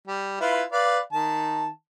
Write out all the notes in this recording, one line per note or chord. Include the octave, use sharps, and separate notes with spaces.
G3
E4 F4 B4
B4 D5 F5
D#3 A5